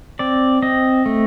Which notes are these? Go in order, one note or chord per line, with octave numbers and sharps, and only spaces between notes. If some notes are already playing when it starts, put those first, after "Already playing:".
C4 D5
C4 D#5
A3